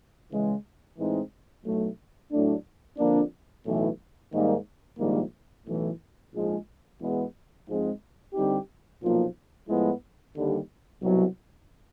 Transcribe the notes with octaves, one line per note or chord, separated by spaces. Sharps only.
C#3 E3 G#3
A2 E3 G#3 C4 D#4
B1 A2 F#3 A3
A2 F#3 A3 D4
F2 D3 F3 A#3 D4
B1 A2 E3
G#2 D#3 G3 A#3 D#4
A#1 G#2 D#3 G3 A#3
B1 A2 E3
A#1 G#2 F3 G#3
E2 B2 G#3 B3
G#2 F3 G#3 C4
D3 G3 C4 D#4 G4
B1 A#2 F3 A#3
A2 F3 G#3 B3 E4
D#2 D3 G3
C2 B2 F#3